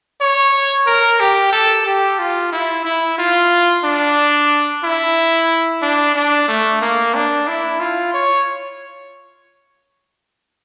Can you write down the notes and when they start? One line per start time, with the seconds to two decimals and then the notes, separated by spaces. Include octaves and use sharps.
0.21 C#5
0.87 A#4
1.20 G4
1.52 A4
1.86 G4
2.19 F4
2.52 E4
2.85 E4
3.18 F4
3.84 D4
4.84 E4
5.82 D4
6.15 D4
6.48 A3
6.81 A#3
7.14 D4
7.48 E4
7.80 F4
8.14 C#5